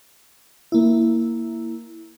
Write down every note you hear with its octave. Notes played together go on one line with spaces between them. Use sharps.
A#3 E4